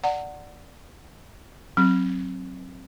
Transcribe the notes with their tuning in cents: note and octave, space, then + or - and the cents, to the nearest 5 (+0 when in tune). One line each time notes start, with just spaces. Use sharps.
D5 +0 F#5 +0 A#5 -45
F#3 +0 C4 +20